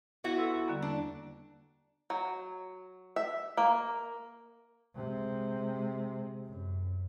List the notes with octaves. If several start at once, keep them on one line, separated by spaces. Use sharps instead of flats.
B3 E4 F#4
A4 C6 E6
E2
D3 G3 A#3
D4
F#3
E5
A#3
C3 G#3
F#2